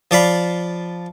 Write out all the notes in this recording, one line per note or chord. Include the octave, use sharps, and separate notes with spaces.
F3 D5 F5 B5